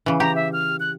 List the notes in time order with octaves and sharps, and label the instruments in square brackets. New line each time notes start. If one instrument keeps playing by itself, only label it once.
[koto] C#3 E3
[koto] G4 [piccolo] A#5
[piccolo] E5
F6
F#6